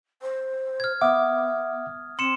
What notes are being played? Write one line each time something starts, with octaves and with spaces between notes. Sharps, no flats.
C5
F6 G#6
B3 E5 F#5 D6 D#6
C4 C6 C#7 E7